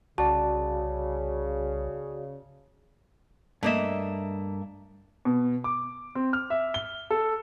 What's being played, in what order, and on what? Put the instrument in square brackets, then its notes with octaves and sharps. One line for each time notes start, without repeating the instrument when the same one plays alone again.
[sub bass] C2 [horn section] C#3 [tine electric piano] F#4 D5 [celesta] A5
[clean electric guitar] G2 E5 [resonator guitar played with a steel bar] A3 A#3 D#5
[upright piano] B2
D6
C4
F6
E5
G7
A4